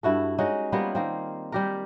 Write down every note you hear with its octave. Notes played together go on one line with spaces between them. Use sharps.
G2 E4 F#4 A4
G#3 C#4 D#4 F#4
G3 A#3 B3 F4
D#3 A#3 C4
G3 G4 A#4